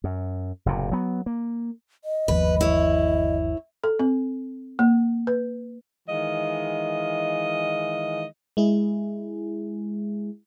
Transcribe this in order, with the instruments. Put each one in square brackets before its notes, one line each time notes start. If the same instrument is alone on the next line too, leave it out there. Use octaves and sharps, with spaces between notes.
[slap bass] F#2
F#1 A2 C3
F#3 B3
A#3
[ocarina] D#5
[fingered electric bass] G1 D#2 F3 [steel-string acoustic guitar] B4
[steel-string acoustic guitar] E4 C#5
[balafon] A4
C4
A#3
B4
[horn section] D#3 E3 G#3 D#5 F5
[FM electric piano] G#3 E4 G#4